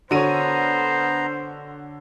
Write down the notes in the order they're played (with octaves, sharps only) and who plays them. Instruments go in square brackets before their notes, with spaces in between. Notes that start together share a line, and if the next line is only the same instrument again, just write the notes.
[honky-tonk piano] D3 D#7 [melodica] B3 A#5 [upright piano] F#4 C#5 [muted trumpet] C5